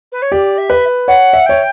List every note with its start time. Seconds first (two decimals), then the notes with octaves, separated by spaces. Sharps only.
0.12 B4
0.22 C#5
0.31 G4 D5
0.58 E5
0.70 B4
1.08 C#5 F#5
1.33 E5
1.46 C#5 G5